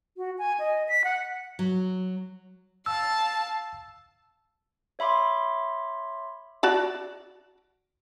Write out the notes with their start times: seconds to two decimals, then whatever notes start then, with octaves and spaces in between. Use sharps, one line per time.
0.17 F#4
0.38 G#5
0.59 D#5
0.88 B6
1.04 F#5
1.59 F#3
2.86 F5 A5 E6
4.99 C#5 E5 B5 C6 D6
6.63 F#4 D5 A5